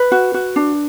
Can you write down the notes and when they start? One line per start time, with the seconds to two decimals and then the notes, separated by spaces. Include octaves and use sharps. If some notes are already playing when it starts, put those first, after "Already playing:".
Already playing: B4
0.12 F#4
0.34 F#4
0.56 D4